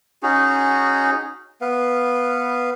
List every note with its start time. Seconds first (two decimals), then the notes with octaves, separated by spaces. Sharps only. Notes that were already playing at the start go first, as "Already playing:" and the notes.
0.23 C#4 D#4 F#4 G#4
1.61 B3 B4 F5